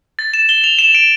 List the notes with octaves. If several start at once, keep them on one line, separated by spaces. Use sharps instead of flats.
A6
E7
G7
F7
E7
D7